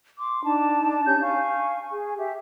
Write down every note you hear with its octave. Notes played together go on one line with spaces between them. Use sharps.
C6 D6
D4 D#4 A5
C#4 G4 G6
F5 G#5 C#6
G#4
G4 E5